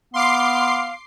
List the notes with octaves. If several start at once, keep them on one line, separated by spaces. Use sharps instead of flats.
B3 F5 C6 D6 C7